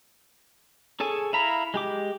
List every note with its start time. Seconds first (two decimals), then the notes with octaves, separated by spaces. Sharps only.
1.00 G#4 A4 C#5 G#5
1.33 E4 F5 A#5 B5
1.74 G#3 G4 D6